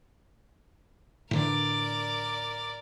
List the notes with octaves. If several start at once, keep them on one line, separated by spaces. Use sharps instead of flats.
A2 D3 E3 A#4 D5